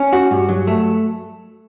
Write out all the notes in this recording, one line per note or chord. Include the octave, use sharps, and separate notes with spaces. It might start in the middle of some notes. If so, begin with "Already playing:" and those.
Already playing: C#4
F#4
G2
F#3
A3